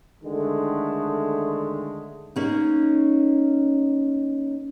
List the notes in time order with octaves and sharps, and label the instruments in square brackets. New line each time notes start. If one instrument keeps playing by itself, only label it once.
[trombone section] D3 D#3 G#3 A3
[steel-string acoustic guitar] A#3 C#4 D#4